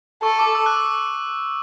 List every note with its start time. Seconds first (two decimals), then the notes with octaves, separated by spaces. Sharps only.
0.23 A4 C#6
0.39 D6
0.55 E6
0.66 F#6
0.76 E6